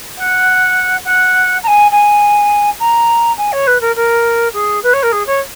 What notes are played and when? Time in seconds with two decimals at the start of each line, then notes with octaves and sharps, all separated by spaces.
0.17 F#5
1.05 F#5
1.63 A#5
1.67 G#5
1.91 G#5
2.79 A#5
3.37 G#5
3.52 C#5
3.67 B4
3.80 A#4
3.95 A#4
4.53 G#4
4.83 B4
4.93 C#5
5.02 A#4
5.12 G#4
5.26 C#5